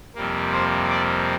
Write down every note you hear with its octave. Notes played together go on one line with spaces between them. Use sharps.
F2 C3 G3 A#3
C5
D5